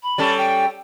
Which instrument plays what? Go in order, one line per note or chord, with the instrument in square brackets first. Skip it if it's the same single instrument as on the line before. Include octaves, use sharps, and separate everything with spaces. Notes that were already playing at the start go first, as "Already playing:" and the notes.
[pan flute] B5
[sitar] G3 C#4 A4
[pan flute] G5